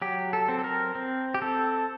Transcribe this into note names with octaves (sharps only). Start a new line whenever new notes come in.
F#3 G4
A4
C4
A4
A#4
C4
G4
C4 A4